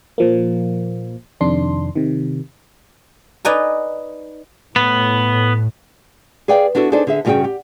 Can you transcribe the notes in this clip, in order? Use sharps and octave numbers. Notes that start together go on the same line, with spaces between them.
A#2 F3 A#3
F2 C3 D#3 D4 C6
C3 D#3
D#4 B4 D5 G#5 A#5
A2 B3
G#4 B4 D5 F5 G5
B3 D4 E4 F#4 A4
D4 D#4 G#4 A4 C5 D5
D3 G#4 E5
G2 C#3 B3 F#4 G#4 G5
G4